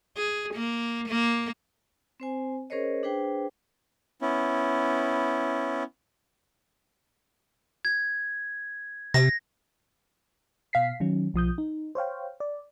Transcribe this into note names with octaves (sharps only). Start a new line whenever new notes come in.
G#4
A#3
A#3
C4 C5 G#5
C#4 G#4 A#4 C5 C#5 D#5
D4 G#4 B4 C5 G5
B3 C#4 E4
G#6
C3 A#6
B2 F5 B6 C7
D#3 F#3 C#4
B1 F3 D#6 G6
D#4
C5 C#5 F5 G5
D5